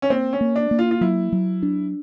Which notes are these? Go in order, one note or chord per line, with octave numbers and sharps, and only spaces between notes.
C#4
A#3 C4
C#4
A#3
D4
A#3
F4
F4
F#3 E4
F#3
D4